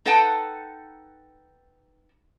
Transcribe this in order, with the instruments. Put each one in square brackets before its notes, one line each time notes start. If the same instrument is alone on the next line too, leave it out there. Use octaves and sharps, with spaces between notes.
[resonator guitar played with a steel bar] D#4 A4 B4 F#5 G5 A5